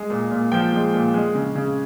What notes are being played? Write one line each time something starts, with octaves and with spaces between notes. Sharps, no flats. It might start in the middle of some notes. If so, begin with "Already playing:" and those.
Already playing: G#3
A#2
A#2
F3 G5
G#3
A#2
G#3
C#3
C#3